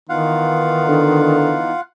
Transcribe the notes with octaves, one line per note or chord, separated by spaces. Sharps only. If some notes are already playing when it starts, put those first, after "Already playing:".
D#3 E3 B3 D#4 F4 F5 F#5
D3